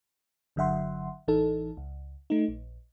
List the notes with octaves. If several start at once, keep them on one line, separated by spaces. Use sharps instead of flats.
G1 D3 F#3 E5 F#5 C6
A1 E3 D#4 A4
C#2
A3 D#4
A#1